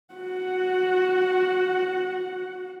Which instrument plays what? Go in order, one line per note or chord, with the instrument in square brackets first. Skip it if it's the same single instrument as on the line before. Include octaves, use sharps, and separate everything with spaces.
[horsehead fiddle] F#4 F#5